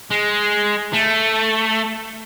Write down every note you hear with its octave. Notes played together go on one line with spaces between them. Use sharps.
G#3
A3